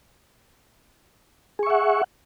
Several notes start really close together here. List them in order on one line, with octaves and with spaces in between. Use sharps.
G#4 C#6 E5 F#5